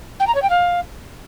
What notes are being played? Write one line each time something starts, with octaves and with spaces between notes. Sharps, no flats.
G5
A#5
C#5
G5
F5